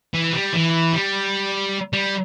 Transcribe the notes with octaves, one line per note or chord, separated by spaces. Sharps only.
E3
G3
E3
G3
G3